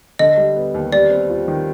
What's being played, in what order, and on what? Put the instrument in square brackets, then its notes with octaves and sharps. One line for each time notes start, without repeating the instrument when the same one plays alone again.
[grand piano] D3 [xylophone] D#5
[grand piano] G3
B3
D#2
[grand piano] G3 [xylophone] D5
[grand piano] C4
F4
D#3